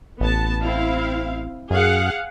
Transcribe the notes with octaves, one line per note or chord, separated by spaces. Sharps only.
A1 B3 A5
C4 E4 F5
F#2 G#4 F5 F#5